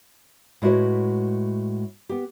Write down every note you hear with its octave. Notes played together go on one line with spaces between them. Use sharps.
A2 G#3 E4 F#4 B4 C#5
B3 G4